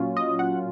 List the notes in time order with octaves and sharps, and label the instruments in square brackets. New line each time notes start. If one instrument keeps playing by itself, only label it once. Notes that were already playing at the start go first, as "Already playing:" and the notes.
Already playing: [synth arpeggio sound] A#2 F#3 C#4 F4
D#5
F#5